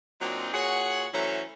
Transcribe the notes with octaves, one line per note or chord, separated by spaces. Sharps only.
A#2 F#3 C4 D4 D#4 F4
A#2 F#4 G#4 C#5 F#5
E3 F#3 A3 C#4 C5 A#5